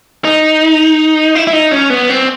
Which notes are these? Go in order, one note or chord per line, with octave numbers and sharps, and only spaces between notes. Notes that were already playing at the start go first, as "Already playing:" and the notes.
D#4
E4
E4
D#4
C#4
B3
C4